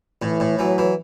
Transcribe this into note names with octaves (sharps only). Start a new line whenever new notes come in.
A2 E3
A2
E3 F#3
E3